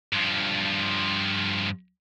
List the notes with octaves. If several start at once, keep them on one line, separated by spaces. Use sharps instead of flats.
G2 F3